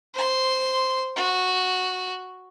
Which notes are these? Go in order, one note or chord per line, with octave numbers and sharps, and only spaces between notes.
C5 C6
F#4